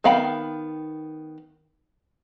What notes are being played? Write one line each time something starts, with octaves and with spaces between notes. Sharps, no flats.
D#3 B3 F5 G5 B5